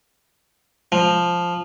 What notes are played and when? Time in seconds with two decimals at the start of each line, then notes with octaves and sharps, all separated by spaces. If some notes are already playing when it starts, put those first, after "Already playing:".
0.92 F3